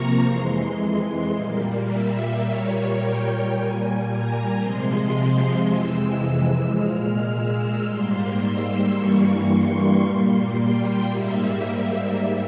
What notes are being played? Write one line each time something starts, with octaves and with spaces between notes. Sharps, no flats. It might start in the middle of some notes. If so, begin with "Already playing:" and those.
Already playing: C3 F3 A#3 A#5 C#6
F2 E3 G#3 C6
C6
A#2 G3 A#3
E5
A#2 G3 A#3 C#5
G5
A#2 G3 A#3 G#5
A#5
C3 F3 G#3 C6
F2 C3 E3 G#3 E6
E6
A#2 G#3 F6
E6
G#2 G3 A#3 C6
E6
G2 E3 G3 A#3 C#6
C6
A#2 G3 A#3 C6
G5
G#2 G3 A#3 E5